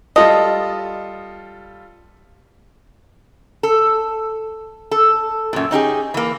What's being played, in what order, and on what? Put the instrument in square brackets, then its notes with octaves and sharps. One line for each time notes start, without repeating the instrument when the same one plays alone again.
[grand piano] G3 F4 A4 [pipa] D#5
[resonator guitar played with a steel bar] A4
A4
F#2 A#2
C#4 D#4 G4 G#4
E3 A#3